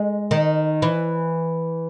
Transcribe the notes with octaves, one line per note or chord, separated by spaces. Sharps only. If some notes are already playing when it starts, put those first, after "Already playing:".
Already playing: G#3
D#3
E3